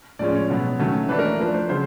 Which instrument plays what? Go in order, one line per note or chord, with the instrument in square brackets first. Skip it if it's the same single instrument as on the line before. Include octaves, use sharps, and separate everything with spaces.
[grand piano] A2 F3 G#3 C#4 D5
C#5
B2 F#3 B3
D#3 F#3 A3 C#4
E3 A3 D4 B4
A#4
F3 A3 D4 B4
C5
C#3 F#3 C5